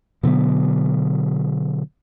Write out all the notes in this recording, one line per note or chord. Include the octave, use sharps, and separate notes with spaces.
B2 D3 F#3 B3